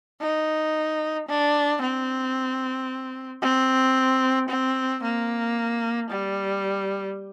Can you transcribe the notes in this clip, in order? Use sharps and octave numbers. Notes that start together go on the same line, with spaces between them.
D#4
D4
C4
C4
C4
A#3
G3